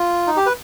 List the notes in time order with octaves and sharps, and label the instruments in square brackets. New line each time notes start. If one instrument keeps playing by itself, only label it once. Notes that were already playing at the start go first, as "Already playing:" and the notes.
Already playing: [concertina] F4
D#4
G4
B4